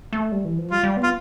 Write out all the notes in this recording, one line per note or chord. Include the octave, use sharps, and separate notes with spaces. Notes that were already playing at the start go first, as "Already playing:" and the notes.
A3
G3
E3
F3
G3 F4
G3
B3
F4